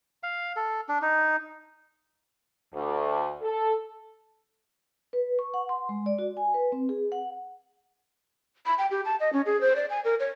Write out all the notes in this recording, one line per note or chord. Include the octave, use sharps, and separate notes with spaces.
F5
A4
D4
D#4
D2
A4
B4
C#6
F#5
C6
G#3
D5
F#4
G#5
B4
C4
G#4
F#5
B5
G5
G4
A5
D#5
C#4
G#4
C5
D5
G#5
A#4
C#5